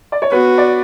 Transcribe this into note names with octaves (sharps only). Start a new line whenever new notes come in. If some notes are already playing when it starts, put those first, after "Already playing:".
D5
C#5
B3 F#4 B4
D5